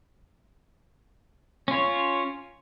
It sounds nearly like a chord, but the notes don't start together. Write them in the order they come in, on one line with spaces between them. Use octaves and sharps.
C#4 F4 C#5